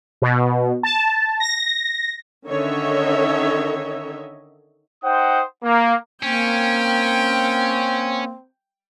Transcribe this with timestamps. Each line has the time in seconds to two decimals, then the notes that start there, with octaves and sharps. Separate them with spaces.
0.22 B2
0.83 A5
1.40 A#6
2.47 D3 D#3 C#4 C#5 D#5 E5
5.05 D#4 C5 F#5 G5 D#6
5.64 A#3
6.23 A#3 C4 C#4 G5